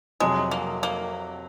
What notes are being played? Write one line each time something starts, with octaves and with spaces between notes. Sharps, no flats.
F2 C3 F#3 G#3
A#3
A#3